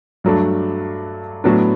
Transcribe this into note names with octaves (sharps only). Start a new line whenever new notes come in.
G2 F#3 A3 D4
A2 F#3 B3 D4